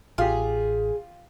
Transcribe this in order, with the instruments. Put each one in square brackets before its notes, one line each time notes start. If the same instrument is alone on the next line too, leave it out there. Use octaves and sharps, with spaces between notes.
[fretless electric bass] A1 [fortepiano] F4 G4 [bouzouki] G#4